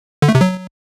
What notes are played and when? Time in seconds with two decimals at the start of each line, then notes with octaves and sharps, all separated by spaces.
0.22 D3
0.29 A3
0.35 C3
0.41 F#3